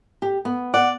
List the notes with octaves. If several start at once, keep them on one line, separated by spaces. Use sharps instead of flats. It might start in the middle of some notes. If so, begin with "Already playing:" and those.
G4
B3
D5 F#5